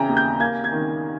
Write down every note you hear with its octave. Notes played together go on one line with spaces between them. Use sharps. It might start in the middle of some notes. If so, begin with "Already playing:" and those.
Already playing: C#3 E3 G5 A#5
D#2
G6
A#3 G#6
G#6
D#3